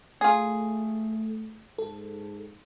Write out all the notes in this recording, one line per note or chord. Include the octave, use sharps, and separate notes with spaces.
A3 F4 G#4
G#2 A4